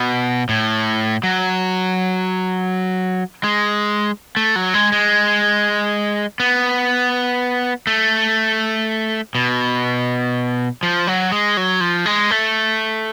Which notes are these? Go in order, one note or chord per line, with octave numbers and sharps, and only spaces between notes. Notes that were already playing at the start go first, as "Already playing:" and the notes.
Already playing: B2
A2
F#3
G#3
A3
F#3
G#3
G#3
B3
A3
B2
F3
F#3
G#3
F#3
F3
G#3
A3